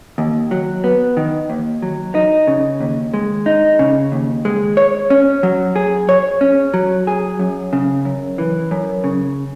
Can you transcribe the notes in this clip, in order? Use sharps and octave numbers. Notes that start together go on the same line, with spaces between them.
D#2
F#3
B3
D#3
D#2
F#3
D#4
C#3
D#2
G#3
D#4
C#3
D#2
G#3
C#5
C#4
F#3
G#4
C#5
C#4
F#3
G#4
F#2
C#3
F#2
E3
F#2
C#3